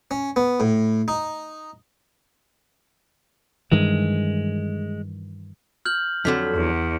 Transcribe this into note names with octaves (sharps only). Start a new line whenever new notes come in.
C#4
B3
A2
D#4
G2 D#3 E3 G#3
F6 G6 F#7
F2 D3 F#3 B6
E2